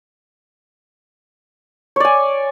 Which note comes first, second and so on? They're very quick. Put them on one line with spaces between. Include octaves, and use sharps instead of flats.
C#5 D5 G#5